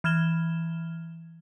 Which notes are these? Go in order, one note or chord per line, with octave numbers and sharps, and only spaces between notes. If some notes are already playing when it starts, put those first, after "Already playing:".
E3 F6 G#6 E7 G7